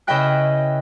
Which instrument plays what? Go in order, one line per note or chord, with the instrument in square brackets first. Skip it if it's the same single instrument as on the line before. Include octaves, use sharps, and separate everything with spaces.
[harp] C#3 E4 B4 D#5 G5 F#6